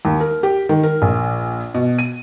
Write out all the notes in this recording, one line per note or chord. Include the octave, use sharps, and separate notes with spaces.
D#2
A#4
G4
D#3
A#4
A#1
B2
D#7